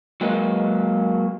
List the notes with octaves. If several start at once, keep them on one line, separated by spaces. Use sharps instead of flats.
F#3 G#3 A#3 B4 D#5